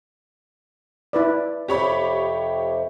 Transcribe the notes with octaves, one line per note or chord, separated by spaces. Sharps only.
E4 B4 D5
F2 C3 G4 C#5 B5